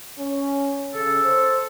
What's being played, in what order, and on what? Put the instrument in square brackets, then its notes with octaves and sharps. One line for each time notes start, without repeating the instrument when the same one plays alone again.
[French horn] C#4
[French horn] C#3 [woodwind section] A4
[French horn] C5